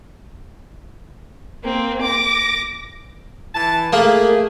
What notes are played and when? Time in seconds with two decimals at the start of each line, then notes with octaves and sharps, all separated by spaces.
1.64 A#3 C4
2.02 D6 A#6
3.54 E3 A5
3.93 A3 A#3 G#4